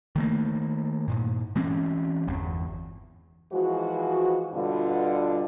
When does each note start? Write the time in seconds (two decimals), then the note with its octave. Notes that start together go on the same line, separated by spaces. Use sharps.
0.16 D#3 A3 A#3
1.08 G2 A#2
1.56 E3 G#3 C4 C#4
2.27 G1 E2
3.52 E3 F3 G#3 F#4
4.54 G2 B2 D3 F4